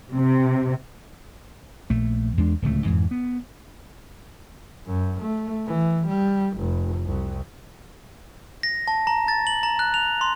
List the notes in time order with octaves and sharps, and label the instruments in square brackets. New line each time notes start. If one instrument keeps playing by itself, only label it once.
[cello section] C3
[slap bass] A#1 A3
E2 G#3 D4
D1 C#2 A3
F2 G#2 E3
B3
[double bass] F#2
A3
E3
G3
F1
C2
[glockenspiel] A#6
A5
A#5
A6
F#7
A#5
F#6
F7
C6